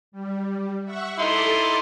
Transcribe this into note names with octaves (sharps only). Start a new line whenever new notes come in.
G3
E5 F#5 C#6
D#4 E4 A4 A5 C6 D6